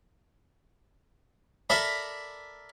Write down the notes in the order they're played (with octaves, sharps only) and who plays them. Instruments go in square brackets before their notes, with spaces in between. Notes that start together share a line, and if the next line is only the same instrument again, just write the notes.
[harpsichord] A4 A#4 D5 E5 B5